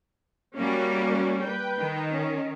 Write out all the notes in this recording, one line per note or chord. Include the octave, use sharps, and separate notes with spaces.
G3 A#3 C#4 F#4
B4 G5
D#3
C#4